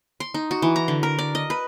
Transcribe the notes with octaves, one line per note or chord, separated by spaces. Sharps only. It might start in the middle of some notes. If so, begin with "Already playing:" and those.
C6
D#4
F#4
E3
A#5
D3
A#4
D5
D#5
B4